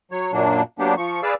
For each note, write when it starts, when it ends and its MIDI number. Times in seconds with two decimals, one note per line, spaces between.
0.12 0.32 54
0.12 0.32 73
0.33 0.62 42
0.33 0.62 46
0.33 0.62 54
0.33 0.62 58
0.33 0.62 62
0.79 0.95 54
0.79 0.95 58
0.79 0.95 59
0.79 0.95 62
0.79 0.95 67
0.97 1.21 53
0.97 1.21 85
1.23 1.34 68
1.23 1.34 71
1.23 1.34 74
1.23 1.34 77
1.23 1.34 88